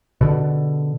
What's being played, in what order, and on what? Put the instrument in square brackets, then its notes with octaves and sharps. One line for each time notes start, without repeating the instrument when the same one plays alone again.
[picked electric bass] B2 D3